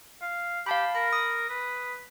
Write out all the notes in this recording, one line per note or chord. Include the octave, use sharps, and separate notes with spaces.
F5
G4 F5 A5 B5
A#4 B5
D#6
B4